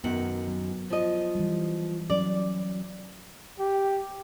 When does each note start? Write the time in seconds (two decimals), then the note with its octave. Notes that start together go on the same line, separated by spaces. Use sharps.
0.04 F#2 D#3 B3 F#5
0.48 F#3
0.90 F3 D#5
1.35 E3 G3
2.10 F#3 C#4 D5
3.59 G4